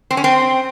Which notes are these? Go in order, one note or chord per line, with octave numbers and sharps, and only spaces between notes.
C4
C#4
C4